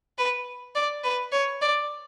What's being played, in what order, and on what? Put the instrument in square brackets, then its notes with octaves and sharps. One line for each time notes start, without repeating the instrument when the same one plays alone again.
[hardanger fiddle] B4
D5
B4
C#5
D5